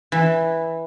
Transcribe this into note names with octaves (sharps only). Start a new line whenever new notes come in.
E3